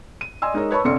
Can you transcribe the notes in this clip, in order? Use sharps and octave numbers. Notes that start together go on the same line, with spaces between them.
D#7
D5 D#5 G#5 C6 E6
G#3 D#4 A#4 C#5 D#5
B4 C#5 A5 B5 C#6
C2 F2 D3 C#4 C6 C#7